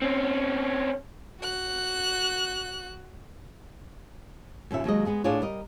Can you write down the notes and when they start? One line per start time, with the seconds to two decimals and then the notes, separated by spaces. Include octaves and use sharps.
0.02 C4 C#4
1.41 F#4 F#6
4.71 D#2 A#2 C#4 E5
4.84 D#2 F#3 G#3 D#5
5.05 G#3 B3 G#4 D#5
5.24 A2 D4 F4 G#4 C#5
5.41 G3 A#4 D#5